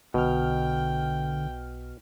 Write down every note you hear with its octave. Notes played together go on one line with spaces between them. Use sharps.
B1 B2 D3 G5 F6